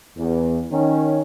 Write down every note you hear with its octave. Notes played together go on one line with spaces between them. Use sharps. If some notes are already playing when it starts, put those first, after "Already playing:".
E2
D#3 C#4